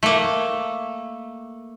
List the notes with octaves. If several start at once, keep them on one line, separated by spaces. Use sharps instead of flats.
A3 A#3